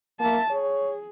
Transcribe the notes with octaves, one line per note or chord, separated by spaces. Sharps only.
A#3 E5 A5
G#4 C#5